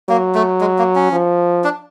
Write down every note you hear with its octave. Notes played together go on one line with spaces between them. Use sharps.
F#3 A#3
A3
G#3
A#3
C#4
F3
D4